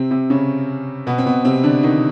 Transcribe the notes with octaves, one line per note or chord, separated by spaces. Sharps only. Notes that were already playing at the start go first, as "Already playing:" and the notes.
Already playing: C3 C4
C3 C4
C#3 C#4
B2 B3
C4
B2 B3
C3 C4
D3 D4
D#3 D#4